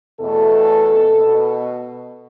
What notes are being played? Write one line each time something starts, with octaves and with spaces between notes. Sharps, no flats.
E2 B2 A3 A4
B2 B3